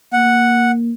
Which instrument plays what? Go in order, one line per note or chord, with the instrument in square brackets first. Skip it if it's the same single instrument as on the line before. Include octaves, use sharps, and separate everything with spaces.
[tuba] A#3 [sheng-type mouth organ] F#5